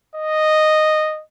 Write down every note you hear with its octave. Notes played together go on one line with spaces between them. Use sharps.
D#5